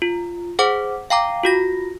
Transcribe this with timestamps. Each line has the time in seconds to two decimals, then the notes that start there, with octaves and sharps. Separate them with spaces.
0.02 F4
0.59 G#4 C5 F#5 D6
1.10 F5 G5 A#5 D6
1.43 F4 F#4 A#6